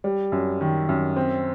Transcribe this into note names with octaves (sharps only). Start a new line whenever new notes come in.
G3
F#2
D#3
F#2
C4